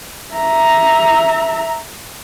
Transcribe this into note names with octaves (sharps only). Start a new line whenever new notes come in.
E5 A#5